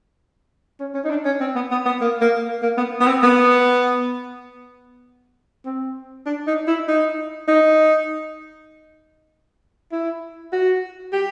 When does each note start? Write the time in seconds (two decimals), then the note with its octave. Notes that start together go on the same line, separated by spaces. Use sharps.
0.80 C#4
0.94 C#4
1.05 D#4
1.10 D4
1.25 C#4
1.41 C4
1.56 B3
1.71 B3
1.86 B3
2.01 A#3
2.21 A#3
2.63 A#3
2.77 B3
3.01 B3
3.07 C4
3.23 B3
5.66 C4
6.26 D4
6.47 D#4
6.68 E4
6.88 D#4
7.48 D#4
9.92 E4
10.53 F#4
11.13 G4